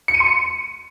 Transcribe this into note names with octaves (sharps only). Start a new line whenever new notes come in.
C#7
D#7
C6
C#7